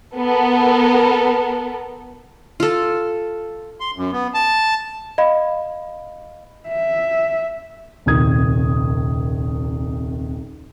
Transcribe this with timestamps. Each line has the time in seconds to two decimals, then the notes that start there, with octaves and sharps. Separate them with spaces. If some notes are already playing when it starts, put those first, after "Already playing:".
0.17 B3 A4 A#4
2.60 F4 A4
3.80 C6
3.96 F#2
4.12 B3
4.34 A5
5.18 D#5 F5 B5
6.68 E5
8.06 D#1 C2 D#3 D#6 G#6